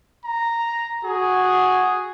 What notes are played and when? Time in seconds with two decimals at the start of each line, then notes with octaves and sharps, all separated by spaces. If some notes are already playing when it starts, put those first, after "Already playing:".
0.25 A#5
1.05 F#4 G#4